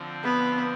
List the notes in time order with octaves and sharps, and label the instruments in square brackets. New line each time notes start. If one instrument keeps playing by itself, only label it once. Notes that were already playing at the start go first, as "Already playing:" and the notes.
Already playing: [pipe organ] D3 F3 C4
[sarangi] B3